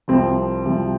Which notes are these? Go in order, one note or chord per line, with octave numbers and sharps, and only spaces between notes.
C2 C3 F3 C4
C2 C3 F3